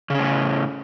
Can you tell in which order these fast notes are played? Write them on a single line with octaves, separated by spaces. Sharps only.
C#3 C#4 A2